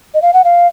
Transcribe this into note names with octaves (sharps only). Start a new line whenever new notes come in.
D#5
F5
F#5
F5